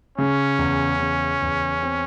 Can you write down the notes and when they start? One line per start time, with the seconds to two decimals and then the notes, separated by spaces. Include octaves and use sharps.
0.18 C#3 C#4
0.59 E2
1.00 C#3
1.42 E2
1.83 C4